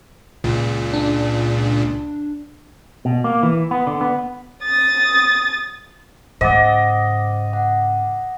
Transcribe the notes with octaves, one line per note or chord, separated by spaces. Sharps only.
C#2 A#2 C#3
D4
B2
A#3
E3
B3
D3
B3
D#6 A6
G#2 C#3 C5 D#5 F#5 D6 A6
F#5